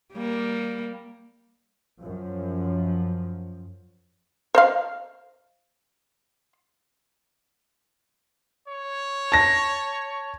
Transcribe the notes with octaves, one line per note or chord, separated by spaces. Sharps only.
G3 A#3
F#2 F3
C5 D#5 F5
C#5
A5 A#6